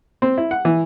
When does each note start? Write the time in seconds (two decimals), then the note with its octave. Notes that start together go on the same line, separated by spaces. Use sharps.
0.22 C4
0.38 E4
0.51 F#5
0.65 E3